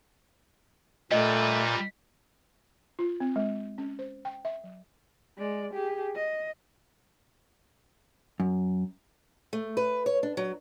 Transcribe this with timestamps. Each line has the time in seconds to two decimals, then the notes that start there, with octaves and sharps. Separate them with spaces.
1.12 A#2 G3 A3 B4 D#5
2.99 F4
3.20 C4
3.36 G#3
3.78 C#4
3.99 C5
4.25 G5
4.45 E5
4.64 F#3
5.37 G#3 D5
5.74 G4 G#4
6.16 D#5
8.40 F#2
9.53 A3
9.77 B4
10.06 C#5
10.23 D4
10.37 F#3